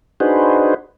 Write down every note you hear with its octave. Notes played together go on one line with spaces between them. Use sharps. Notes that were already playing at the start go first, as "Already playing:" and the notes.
D4 D#4 F#4 G#4 B4 C5